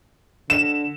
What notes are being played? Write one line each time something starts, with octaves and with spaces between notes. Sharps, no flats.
D3 E7